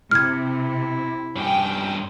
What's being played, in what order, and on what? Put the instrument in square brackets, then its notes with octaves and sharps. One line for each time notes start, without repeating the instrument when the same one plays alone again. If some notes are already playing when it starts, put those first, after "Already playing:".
[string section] C3 [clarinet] E4 [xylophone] F6 G#6
[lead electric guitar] G2 C#4 [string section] G5